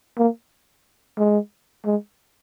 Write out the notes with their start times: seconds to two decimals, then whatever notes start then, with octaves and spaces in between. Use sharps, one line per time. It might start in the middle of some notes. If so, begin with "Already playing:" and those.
0.18 A#3
1.18 G#3
1.86 G#3